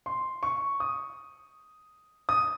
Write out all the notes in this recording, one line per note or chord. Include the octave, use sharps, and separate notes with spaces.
C6
C#6
D#6
D#6